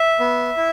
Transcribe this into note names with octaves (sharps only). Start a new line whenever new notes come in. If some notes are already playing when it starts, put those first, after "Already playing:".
Already playing: E5
B3
E4